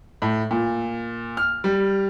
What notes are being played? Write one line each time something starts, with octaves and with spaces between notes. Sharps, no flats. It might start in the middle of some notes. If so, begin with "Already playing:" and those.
A2
A#2
F6
G3